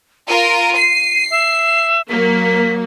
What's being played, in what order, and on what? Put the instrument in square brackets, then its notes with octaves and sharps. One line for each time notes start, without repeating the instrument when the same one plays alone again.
[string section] F4 A#4 [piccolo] D#7
[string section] C7
[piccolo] E5
[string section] F#3 A#3 [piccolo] B6